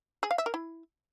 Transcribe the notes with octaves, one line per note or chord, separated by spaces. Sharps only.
G#4
F5
E5
A#4
E4